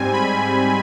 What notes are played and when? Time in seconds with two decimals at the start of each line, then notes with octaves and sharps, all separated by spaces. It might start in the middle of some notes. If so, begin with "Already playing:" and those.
Already playing: G#2 G3 C4 G#5
0.13 B5